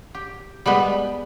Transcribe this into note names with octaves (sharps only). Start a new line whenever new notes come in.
G4
G3 G#3 B3 B4